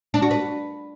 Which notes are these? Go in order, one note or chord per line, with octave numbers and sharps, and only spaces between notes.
D4
F#4
B4